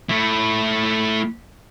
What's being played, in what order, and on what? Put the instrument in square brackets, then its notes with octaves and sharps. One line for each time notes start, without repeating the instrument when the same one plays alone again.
[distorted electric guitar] A3 E4